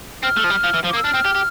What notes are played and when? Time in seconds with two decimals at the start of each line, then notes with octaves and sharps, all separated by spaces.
0.23 C4 F6
0.37 A3
0.44 F3
0.50 G3
0.64 F3
0.74 E3
0.84 F3
0.90 D6
0.93 A#3
0.97 E6
1.04 D4 F6
1.14 C4
1.25 G4
1.35 G4